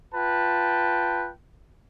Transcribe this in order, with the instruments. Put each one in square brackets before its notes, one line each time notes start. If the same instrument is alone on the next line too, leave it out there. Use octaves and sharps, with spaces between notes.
[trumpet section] F4 B4 G5 A5